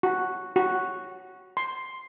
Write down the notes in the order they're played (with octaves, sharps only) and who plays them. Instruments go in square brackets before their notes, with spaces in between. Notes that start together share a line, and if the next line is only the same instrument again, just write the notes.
[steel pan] F#4
F#4
C6